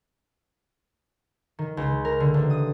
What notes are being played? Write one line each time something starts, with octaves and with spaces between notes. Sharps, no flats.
D#3
C#2
A#4
D3
A1
D#6